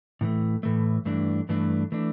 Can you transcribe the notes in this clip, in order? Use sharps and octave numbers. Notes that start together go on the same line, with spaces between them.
A2 E3 A3
A2 E3 A3
G2 E3 A3 D4
G2 E3 A3 D4
E3 A3 D4